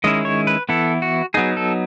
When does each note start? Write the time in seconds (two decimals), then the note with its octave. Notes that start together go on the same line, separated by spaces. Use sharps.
0.04 D#3 G#3 C#4 E4 D#5
0.25 C#5
0.47 B4
0.69 E3 B3 E4 A4
1.02 F#4
1.34 F#3 B3 D#4 G#4
1.57 A4